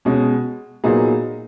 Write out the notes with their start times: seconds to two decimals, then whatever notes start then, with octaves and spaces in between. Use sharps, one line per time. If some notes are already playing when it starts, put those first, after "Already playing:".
0.05 B2 G#3 C#4
0.84 A#2 F#3 B3 D#4 G#4